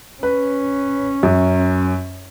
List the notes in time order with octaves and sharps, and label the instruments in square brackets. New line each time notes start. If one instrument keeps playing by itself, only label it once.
[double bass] C#4 [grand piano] B4
[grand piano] F#2